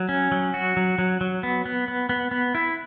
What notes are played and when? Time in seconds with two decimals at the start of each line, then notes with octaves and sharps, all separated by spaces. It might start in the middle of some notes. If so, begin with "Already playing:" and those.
Already playing: F#3
0.09 C#4
0.32 F#3
0.54 F#4
0.77 F#3
0.98 F#3
1.21 F#3
1.43 B3
1.65 B3
1.88 B3
2.09 B3
2.31 B3
2.55 E4